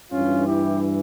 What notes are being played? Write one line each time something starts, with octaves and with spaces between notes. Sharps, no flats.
G2 E3 C#4 F4
E4 G4